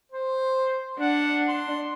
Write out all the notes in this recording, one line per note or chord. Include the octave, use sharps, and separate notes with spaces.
C5
D4 F#5
C6